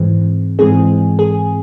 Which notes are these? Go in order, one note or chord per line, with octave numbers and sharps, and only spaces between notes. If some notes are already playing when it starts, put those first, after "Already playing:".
Already playing: G#2 E3 G#3 C4
G#2 E3 G#3 C4 G#4
G#4